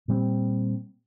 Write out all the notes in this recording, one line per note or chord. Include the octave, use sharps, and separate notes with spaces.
A#2 G3 C4